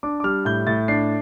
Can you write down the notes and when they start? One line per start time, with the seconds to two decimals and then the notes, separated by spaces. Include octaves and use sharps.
0.03 D4 D6
0.20 D6
0.24 G3 F6
0.45 A2 G6
0.67 A2 A6
0.88 D4 C7